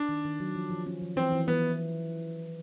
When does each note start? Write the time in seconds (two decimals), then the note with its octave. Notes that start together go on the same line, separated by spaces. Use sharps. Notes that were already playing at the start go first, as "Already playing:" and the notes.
Already playing: D4
0.09 D#3
0.25 D#3
0.40 F#3
0.55 F3
0.71 F3
0.86 C#4
1.02 F3
1.16 E3 C4
1.32 E3
1.47 E3 B3